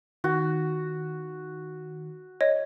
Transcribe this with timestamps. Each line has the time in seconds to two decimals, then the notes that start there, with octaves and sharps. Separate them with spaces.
0.24 D#3 F#4
2.41 C#5 D#5